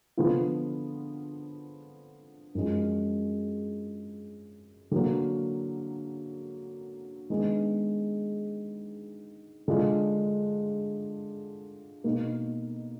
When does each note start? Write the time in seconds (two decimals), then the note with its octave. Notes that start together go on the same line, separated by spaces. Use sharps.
0.17 D3 F3 B3 F4
2.55 F#2 F3 G#3
4.91 D3 F#3 A#3
7.30 D#3 G#3 B3 D4
9.68 D3 G#3 D4 F4
12.04 B2 A#3 D#4